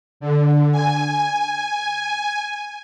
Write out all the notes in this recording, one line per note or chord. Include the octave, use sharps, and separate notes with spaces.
D3
G#5